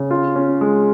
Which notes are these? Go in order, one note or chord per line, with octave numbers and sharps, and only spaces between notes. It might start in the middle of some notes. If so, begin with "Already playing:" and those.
Already playing: C#3
F4
C#4
G#3